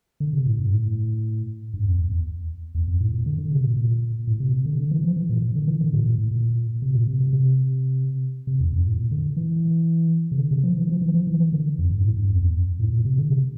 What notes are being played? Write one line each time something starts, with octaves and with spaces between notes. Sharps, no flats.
D3
C3
A2
G2
A2
G2
F2
E2
E2
E2
F2
A2
A#2
D3
D3
C3
A#2
A#2
A2
C3
C3
D3
D3
E3
F3
E3
A#2
A#2
D3
E3
D3
A2
A#2
A2
A#2
C3
A#2
C3
C3
C3
C3
E2
F2
A2
A#2
D3
E3
C3
D3
C3
F3
E3
F3
E3
F3
E3
E3
D3
F2
G2
A2
G2
F2
E2
F2
A2
A#2
C3
D3
C3